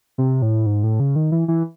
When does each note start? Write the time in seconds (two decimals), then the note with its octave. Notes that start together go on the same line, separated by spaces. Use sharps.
0.18 C3
0.42 A2
0.66 G#2
0.83 A2
1.00 C#3
1.16 D#3
1.32 E3
1.48 E3